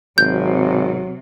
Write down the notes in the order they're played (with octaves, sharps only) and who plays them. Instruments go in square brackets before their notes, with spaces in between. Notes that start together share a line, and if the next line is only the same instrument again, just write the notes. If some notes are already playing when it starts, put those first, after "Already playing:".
[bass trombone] G#1 [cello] C3 [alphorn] F#3 [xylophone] G6